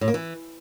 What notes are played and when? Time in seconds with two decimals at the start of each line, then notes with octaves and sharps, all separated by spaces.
0.01 A2
0.08 A#3
0.14 E3